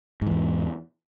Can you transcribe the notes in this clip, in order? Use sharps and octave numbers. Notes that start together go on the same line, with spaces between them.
E2 G#2 E3